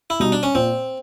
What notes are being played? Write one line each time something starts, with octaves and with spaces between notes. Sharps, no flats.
E4
B2 G3 D#4
D4
C#4
A#2 C4